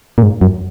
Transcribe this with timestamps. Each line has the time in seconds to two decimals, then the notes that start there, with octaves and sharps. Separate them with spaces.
0.18 A#2
0.23 G#2
0.41 F#2